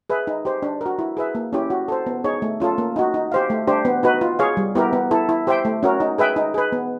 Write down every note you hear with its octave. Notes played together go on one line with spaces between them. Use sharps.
G#4 B4 E5
D#4
G4 C5
D4
F#4 A#4
E4
G#4 B4 E5
A#3
C#4 E4 G4
F#4
A4 C5
B3
D#4 G#4 C#5
A3
C#4 F4 A4
A#3
D#4 F#4
D#4
G4 C5 F5
A3
D4 G4 C5
B3
D#4 F#4 B4
F4
G#4 C#5 F5
G3
B3 E4 G4 A#4
B3
E4 A4
E4
G4 C5 E5 G5
A3
C#4 F#4 A#4
D#4
G#4 B4 E5 G5
D#4
G#4 B4
B3